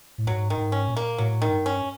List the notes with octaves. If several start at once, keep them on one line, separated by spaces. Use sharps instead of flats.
A2
G#2 F#3
D#3
G#2
C#4
A#2
A#3
A2 F#3
D#3
G2
C#4